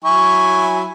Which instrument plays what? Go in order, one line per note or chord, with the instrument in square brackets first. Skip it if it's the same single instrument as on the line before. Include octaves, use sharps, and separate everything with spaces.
[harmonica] F#3 E4 G#5 [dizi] C#6